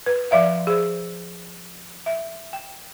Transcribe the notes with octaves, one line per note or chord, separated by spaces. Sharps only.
B4
F3 D5 E5 F5
G#4 C5
E5
G5